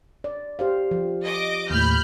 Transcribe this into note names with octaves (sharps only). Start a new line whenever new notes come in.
D5
G4 C5 F5
F3
D#5 D6
D#2 A2 B5 F6 G6